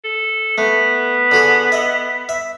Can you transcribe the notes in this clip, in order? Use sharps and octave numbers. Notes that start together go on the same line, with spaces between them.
A4
A3 B3
D3 F#4 G#4
D#5 E5
E5